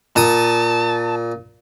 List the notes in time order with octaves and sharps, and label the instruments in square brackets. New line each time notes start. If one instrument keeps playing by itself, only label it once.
[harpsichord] A#2 D#6 [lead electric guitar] A5